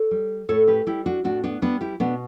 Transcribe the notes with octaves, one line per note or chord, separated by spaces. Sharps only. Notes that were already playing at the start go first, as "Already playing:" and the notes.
Already playing: A4 C#5
G3
A2 A4 C#5
G4 B4
G3 E4 G4
D4 F#4
A2 D4 F#4
B3 D4
G3 B3 D4
E4 G4
B2 B3 D4